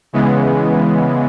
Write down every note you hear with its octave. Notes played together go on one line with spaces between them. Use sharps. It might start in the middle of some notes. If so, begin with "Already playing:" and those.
C#3 E3 G#3 B3